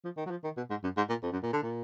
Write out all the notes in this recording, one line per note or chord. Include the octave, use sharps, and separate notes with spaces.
F3
D#3
F#3
F3
D#3
B2
G#2
F#2
G#2
A#2
F2
F#2
A#2
D3
A#2